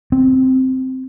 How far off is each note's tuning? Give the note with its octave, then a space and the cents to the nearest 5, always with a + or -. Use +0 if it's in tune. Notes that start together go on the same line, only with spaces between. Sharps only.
C4 -5